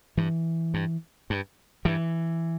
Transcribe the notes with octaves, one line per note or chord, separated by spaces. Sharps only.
G2 E3
G2
G2
G2 E3